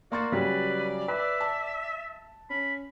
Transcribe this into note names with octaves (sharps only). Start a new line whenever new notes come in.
A#3 F#4 D5 C6 A6
C#3 F#3 G3 B4
B4 E5
A5
C#4 B5